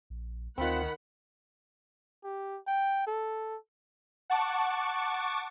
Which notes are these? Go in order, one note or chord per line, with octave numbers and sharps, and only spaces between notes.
A#1
D2 D#3 C4 F4 F#5 B5
G4
G5
A4
F#5 A5 C#6 D6